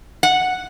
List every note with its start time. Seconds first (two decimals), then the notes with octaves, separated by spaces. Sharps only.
0.23 F#5